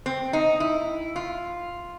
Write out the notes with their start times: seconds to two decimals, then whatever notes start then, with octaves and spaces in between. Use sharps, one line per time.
0.06 C4
0.33 D#4
0.60 E4
1.16 F4